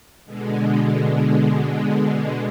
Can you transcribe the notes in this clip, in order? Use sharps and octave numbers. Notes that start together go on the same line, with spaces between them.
B2 D3 G#3